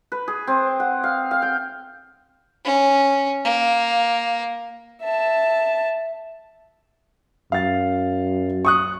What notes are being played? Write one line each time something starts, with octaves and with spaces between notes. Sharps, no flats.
B4
G#4
C4
F#5
F5
F5
G5
C#4
A#3
E5 A5
F#2 F5 A6
C#6 D#6 F#6